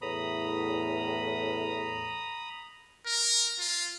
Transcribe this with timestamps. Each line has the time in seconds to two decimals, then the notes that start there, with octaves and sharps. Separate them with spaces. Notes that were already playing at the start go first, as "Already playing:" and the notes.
0.02 E2 A2 A#5 B5 D#6
3.06 A#4
3.60 F4